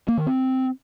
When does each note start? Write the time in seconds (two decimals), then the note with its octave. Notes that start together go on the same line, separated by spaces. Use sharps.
0.08 A#3
0.17 D#3
0.26 C4